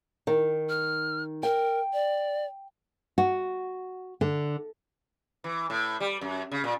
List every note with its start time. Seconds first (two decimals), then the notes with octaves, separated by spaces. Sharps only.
0.27 D#3
0.69 F6
1.43 A#4 G5
1.93 D5
3.18 F#4
4.21 D3
5.44 E3
5.70 A2
6.00 G3
6.21 F#2
6.52 C#3
6.64 A#2